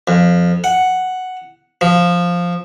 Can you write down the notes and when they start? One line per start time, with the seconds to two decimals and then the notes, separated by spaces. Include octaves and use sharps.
0.08 F2
0.64 F#5
1.81 F3